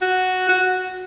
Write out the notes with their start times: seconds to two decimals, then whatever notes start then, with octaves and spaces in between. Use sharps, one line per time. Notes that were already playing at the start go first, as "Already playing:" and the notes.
0.01 F#4
0.49 F#4